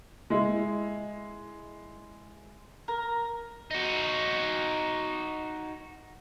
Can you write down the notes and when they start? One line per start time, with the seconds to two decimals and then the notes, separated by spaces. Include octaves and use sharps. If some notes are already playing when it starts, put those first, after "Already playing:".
0.30 G#3 E4
2.88 A#4
3.71 D#4 F#4